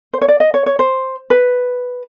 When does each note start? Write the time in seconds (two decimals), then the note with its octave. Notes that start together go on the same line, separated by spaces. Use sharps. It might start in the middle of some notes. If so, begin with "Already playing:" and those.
0.13 C5
0.21 C#5
0.28 D5
0.40 D#5
0.54 C#5
0.66 C#5
0.79 C5
1.30 B4